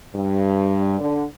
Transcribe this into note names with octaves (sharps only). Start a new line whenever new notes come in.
G2
D3